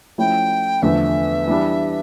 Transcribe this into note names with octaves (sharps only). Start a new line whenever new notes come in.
F3 A3 C#4 E4 G5
E2 D3 F3 A3 D4 E5
E3 G3 D4